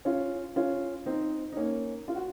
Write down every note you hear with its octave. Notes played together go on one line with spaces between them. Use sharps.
C#4 F4
C#4 F4
C4 D#4
D#4
A#3 C#4
F4
F#4